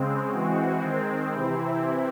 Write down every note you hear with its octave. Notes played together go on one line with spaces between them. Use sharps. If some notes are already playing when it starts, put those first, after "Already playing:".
Already playing: C#3 G#3 C4
E3 G#3 C4 F#4
D#3 G#3 C4
C3 E3 C4 E4